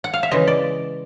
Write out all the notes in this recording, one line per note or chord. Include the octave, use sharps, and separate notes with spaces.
F#5
F5
E5
C#3 E3 G#3 D#5
D5